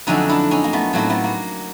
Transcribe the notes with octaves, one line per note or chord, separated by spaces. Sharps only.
F2 D3 F#3 A3 C#4 D#4
D4 E4
C#4 D#4
A#3
A3 B3
A2 F#3 A3 A#3 C4
A3 B3
A#3